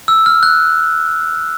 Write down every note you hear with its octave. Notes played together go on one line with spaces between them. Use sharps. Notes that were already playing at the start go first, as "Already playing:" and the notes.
E6
F6
F#6